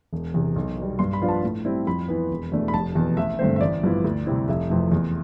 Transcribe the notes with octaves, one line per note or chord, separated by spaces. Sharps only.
E1
E2 C3
B1
B2 G3
G2 C6
B5
F3 B3 D4 F4
A5
A2
G3 C4 E4
F2 B5
E3 B3
E1
E2 B2 A3 D4
B5
F1 A5
E2 B2 B3
A1 E5
G2 D3 A3 C4 C5
E5
A1 D5
G2 F3 B3 E4
D2
C3 G3 C4 E4
F1 E5
F2 C3 E3 A3
E2